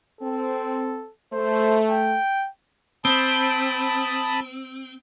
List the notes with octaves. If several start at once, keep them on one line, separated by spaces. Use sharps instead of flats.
C4 A4
A3 C5
G5
C4 A5 B5 D#6